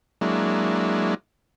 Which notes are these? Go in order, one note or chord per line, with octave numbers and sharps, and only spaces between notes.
F#3 G#3 A#3 D4 E4